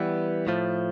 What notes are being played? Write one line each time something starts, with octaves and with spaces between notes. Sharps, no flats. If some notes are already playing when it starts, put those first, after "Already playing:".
Already playing: E3 G3 B3
A2 F3 A3